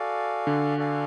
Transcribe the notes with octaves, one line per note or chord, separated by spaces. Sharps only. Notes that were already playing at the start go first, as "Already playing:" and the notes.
Already playing: F#4 A4 D5 F5 G#5
D3
F#4 A4 D5 F5 G#5